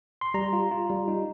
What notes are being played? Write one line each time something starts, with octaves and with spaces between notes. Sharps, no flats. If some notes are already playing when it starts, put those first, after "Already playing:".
C6
G3 A#5
F4
F4
G3
D#4